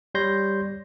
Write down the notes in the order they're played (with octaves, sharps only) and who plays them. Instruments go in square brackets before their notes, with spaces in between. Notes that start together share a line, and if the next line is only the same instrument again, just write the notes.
[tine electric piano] G3 C#5 C6 G6 A#6